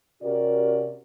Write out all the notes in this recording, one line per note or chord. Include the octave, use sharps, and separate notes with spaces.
C3 C#4 F#4 G4 A#4 D5